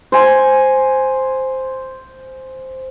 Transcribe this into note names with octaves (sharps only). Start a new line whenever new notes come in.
C5 G#5